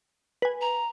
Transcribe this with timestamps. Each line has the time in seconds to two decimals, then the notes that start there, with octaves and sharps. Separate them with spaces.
0.42 B4 G#5
0.61 A#5